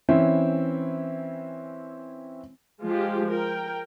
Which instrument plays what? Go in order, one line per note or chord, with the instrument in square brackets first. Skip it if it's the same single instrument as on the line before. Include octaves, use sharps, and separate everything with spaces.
[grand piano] E3 C4 C#4 E4
[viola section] F3 G#3 F4 G4
A#4 G5